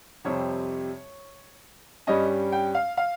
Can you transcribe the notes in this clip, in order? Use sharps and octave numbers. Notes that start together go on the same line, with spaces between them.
F2 C3 G3 C4 C#5
G2 G3 C#4 D#5
G5
F5
F5